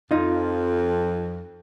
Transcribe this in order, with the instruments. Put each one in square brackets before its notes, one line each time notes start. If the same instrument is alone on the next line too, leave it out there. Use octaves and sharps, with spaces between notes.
[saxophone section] F2 [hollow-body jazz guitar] D#4 F4